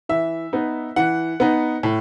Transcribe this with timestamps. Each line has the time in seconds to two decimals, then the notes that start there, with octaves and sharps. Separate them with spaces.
0.09 E3 E5
0.53 B3 D#4
0.96 E3 F#5
1.40 B3 D#4
1.83 A2